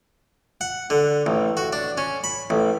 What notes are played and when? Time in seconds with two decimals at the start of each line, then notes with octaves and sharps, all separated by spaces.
0.61 F#5
0.90 D3
1.26 A1
1.57 F#4
1.73 D4
1.98 C#4
2.24 B5
2.50 A1